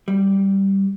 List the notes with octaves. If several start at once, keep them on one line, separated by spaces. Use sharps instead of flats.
G3